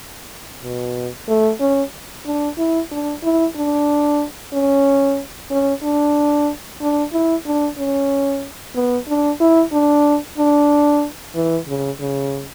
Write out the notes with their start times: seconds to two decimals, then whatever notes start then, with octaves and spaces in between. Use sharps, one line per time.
0.63 B2
1.28 A3
1.60 C#4
2.26 D4
2.58 E4
2.91 D4
3.23 E4
3.56 D4
4.53 C#4
5.50 C#4
5.82 D4
6.81 D4
7.13 E4
7.46 D4
7.78 C#4
8.75 B3
9.08 D4
9.40 E4
9.72 D4
10.38 D4
11.35 E3
11.68 C#3
12.00 C#3